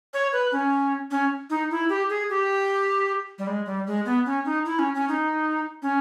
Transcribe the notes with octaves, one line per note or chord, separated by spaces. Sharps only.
C#5
B4
C#4
C#4
D#4
E4
G4
G#4
G4
G3
G#3
G3
G#3
B3
C#4
D#4
E4
C#4
C#4
D#4
C#4